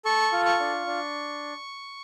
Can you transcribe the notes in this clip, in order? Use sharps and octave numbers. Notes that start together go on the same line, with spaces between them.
A4 C#6
F4
C#6
D4
D4